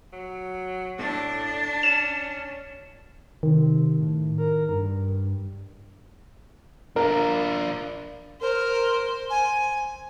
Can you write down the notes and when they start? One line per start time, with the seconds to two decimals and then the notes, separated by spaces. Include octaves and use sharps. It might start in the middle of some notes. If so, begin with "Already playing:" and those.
0.13 F#3
0.99 A2 D4
1.83 C#4 E7
3.43 C3 D#3
3.98 A2
4.38 A#4
4.69 G2
6.96 D4 F4 A#4
8.41 A#4 C5
9.30 G#5